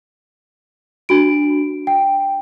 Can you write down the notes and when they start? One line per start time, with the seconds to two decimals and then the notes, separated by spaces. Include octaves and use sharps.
1.09 D4 F#4 D7
1.87 G5